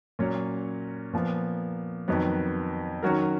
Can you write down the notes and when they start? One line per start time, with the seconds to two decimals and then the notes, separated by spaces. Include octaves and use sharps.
0.19 A#2 F#3 C#4
1.13 A#2 F3 B3
2.08 F2 D#3 F#3 B3
3.03 D#3 F#3 C#4 F#4 A#4